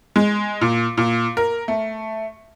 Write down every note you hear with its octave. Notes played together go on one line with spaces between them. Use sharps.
G#3
A#2
A#2
A#4
A3